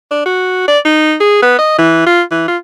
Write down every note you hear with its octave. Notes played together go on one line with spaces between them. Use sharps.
D4
F#4
D5
D#4
G#4
B3
D#5
E3
F4
E3
F4